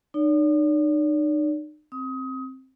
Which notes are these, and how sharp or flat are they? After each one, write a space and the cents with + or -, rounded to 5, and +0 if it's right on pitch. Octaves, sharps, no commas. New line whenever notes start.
D#4 -40 D5 -45
C4 +10 D#6 +25